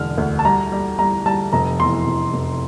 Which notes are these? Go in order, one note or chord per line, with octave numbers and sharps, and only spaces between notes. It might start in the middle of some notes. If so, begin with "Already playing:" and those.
Already playing: E1 D3 F6
D2
A5
G3 A#5
G3
G3 A#5
G3 A5
F1 A#5
E2 C6
F1
F1